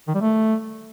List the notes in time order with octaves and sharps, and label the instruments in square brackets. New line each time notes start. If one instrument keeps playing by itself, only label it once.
[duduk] D#3
G3
A3